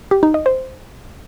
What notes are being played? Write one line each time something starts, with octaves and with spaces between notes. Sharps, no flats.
G4
D#4
D#5
C5